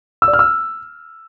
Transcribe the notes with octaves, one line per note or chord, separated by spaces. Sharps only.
E6
D5
F6
E6